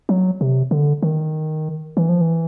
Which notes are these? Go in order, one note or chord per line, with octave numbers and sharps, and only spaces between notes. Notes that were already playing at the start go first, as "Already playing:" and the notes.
F#3
C3
D3
D#3
E3
F3
E3